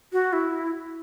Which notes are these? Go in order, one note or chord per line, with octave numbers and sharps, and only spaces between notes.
F#4
E4